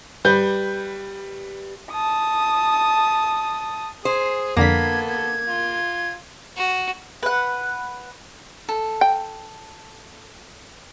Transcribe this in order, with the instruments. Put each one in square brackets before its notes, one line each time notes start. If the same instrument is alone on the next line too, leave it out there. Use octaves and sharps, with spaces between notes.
[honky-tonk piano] G3 B4 G6
[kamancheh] A5 D#6
[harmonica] G#4 D#6 [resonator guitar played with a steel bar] C5 [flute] G#5
[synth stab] F2 D3 B6 [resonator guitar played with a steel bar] A#3 [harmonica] B3 A4 [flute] G#6
[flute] G#6
[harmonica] F4
[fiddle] F#4
[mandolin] B4 F#5
[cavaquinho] A4
[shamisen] G5